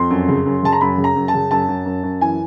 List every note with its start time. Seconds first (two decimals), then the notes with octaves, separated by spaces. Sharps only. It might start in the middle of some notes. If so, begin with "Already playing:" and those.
Already playing: F2 C6
0.10 F#2
0.28 C#3
0.46 F#2
0.63 C#3 A5
0.73 A#5
0.81 F#2 B5
0.98 C#3
1.04 A#5
1.16 F#2
1.28 A5
1.34 C#3
1.51 F#2 A5
1.68 F#2
1.86 F#2
2.03 F#2
2.21 E3 G#5